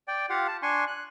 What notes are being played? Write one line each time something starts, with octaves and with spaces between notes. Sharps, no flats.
D5 G5
F4 G4 F5 F#5
A5
D4 G#5 C6 C#6
F#6